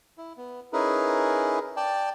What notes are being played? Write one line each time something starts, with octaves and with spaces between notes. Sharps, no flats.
E4
B3
C#4 D#4 E4 G#4 A#4 B4
D5 G5 A5